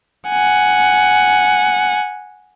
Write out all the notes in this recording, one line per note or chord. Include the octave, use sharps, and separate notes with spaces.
F#5 G#5